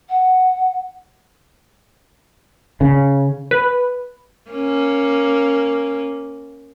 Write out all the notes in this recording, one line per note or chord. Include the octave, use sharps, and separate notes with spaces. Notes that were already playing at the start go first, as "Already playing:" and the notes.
F#5
C#3
B4
A#3 C#4